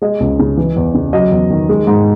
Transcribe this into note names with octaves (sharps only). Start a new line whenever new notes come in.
G#3 D#5
C#2
C#3
E3
E2
C#3
F#3 D#5
E2
D#3
G#3
G#2